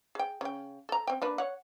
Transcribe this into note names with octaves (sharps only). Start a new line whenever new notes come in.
G#4 G5
C#3 G5
A4 A#5
C4 G5
A#3 D4 B4
C#5 F#5